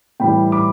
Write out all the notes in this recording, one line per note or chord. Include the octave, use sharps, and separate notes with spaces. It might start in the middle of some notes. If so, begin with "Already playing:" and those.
A2 E3 G3 G5 B5
B5 D6